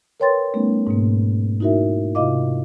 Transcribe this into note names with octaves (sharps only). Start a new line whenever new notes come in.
A#4 B4 C#5 G5 C6 A6
G3 A3 B3 C#4 D#4
G#2 B2 A#3
D#4 E4 F#4 A#4 E5
C3 E4 F4 D#5 F5 D6